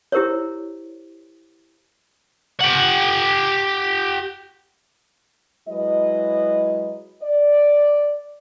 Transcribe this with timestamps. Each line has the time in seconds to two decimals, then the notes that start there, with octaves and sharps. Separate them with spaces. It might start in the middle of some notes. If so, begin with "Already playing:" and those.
0.12 E4 G4 A#4 C5 C#5
2.61 G4 F#5
5.68 F#3 G#3 E4 B4 D#5
7.23 D5